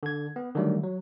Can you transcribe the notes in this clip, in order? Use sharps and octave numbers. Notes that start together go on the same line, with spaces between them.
D3 G#6
B3
D3 D#3 F#3 G3 A3
F#3